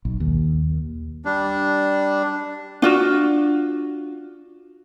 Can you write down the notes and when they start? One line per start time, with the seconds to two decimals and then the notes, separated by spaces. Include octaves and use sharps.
0.05 B1
0.20 D#2
1.25 G3 D4
2.82 D4 F4 F#4